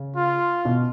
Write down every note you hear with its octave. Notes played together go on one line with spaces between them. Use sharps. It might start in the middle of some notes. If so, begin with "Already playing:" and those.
Already playing: C#3
F4
B2